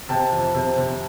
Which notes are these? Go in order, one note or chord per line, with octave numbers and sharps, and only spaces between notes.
C3 G5 A5
F2
C3
C3